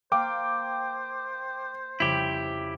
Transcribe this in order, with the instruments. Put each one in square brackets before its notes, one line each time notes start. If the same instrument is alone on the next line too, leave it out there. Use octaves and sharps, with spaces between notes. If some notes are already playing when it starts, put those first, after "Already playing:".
[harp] A#3 F5 A#6 [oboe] C5 [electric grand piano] G5 D6
[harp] F2 C#3 G3 [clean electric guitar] E4 G4